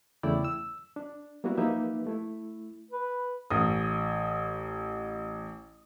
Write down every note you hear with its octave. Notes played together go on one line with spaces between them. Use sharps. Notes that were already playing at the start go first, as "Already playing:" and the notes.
E2 C#3 A3 E4 D5 G5
E6
D4
G3 A#3 B3 E4 F#4
F3 A#3 D#4 G4 B4 E5
A3 E4
B4
A1 D#6